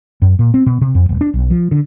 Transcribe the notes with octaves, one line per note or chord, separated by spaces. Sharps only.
F#2
A#2
C4
B2
C3
F2
D#1
D4
B1
F3
D3